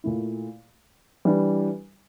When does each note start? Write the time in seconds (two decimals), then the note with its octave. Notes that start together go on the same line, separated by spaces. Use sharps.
0.04 A#2 A3 E4
1.25 E3 G3 D4